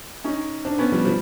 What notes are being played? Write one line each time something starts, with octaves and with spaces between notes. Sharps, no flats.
C#4 D#4
C4 D4
B3 C#4
F3 G3
F3 G3